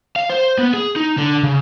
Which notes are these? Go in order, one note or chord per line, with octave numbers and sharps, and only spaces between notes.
F5
C5
B3
G#4
D#4
D3
C#3